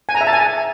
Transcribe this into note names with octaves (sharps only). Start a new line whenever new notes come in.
G#5
A#5
E5
A5
G#5